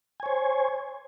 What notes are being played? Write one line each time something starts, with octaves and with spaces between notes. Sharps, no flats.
C5 C#5 G#5